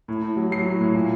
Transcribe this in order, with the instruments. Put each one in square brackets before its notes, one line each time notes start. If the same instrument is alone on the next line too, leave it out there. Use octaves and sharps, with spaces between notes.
[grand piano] A2
A2
F#3
F#3 C7
A2
A2
A#2